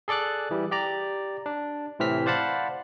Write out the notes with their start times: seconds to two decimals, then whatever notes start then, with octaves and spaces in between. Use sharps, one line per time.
0.08 G#4 A4 D5 D6 F#6
0.51 E3 G3
0.71 G4 D5 A#5
1.46 D4
1.99 A2 C3 E3 C4 F6 B6
2.26 C5 D5 F5 F#5 A5 B5